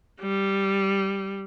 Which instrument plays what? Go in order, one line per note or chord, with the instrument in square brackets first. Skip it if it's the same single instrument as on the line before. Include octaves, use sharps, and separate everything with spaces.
[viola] G3